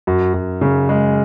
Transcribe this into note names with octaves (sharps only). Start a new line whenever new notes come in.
F#2
F#2
C#3
G#3